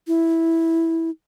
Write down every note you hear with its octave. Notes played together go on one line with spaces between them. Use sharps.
E4